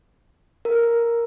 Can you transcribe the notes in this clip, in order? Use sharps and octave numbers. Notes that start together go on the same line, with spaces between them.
A#4